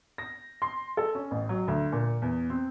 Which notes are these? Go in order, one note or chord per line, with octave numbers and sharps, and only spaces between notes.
A#6
C6
A4
C#4
A1
F#3
D2
A#2
E2
C4